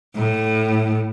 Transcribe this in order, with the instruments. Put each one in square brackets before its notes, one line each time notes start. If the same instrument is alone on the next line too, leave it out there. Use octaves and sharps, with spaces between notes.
[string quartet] A2